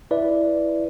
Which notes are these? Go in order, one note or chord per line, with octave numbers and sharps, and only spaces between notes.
E4 B4 D5 E5